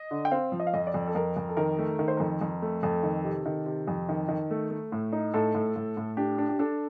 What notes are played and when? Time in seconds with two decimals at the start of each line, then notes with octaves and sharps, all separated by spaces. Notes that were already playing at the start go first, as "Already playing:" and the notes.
Already playing: D#5
0.11 D3
0.25 G5
0.31 C4 F5
0.52 F3
0.60 D#5
0.67 F5
0.74 F2 D#5
0.87 D5
0.94 F2
1.08 A4
1.15 F2 A#4
1.37 F2
1.49 A4
1.57 D#3 A#4
1.78 A3
1.99 D#3 A#4
2.08 C5
2.17 F2 A#4
2.41 F2
2.62 A3
2.83 F2 A4
3.03 D#3
3.24 C3
3.46 D#3
3.66 C3
3.88 F2
4.09 D#3
4.29 D#3
4.51 A3
4.70 A3
4.92 A2
5.12 D#4
5.34 A2 A4
5.55 A2
5.76 A2
5.97 A2
6.17 D4 G4
6.38 D4
6.49 G4
6.59 D4 A4